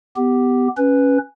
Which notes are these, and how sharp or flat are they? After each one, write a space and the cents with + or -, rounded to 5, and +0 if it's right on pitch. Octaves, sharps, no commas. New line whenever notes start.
B3 +15 G4 +0
C#4 +0 B4 +0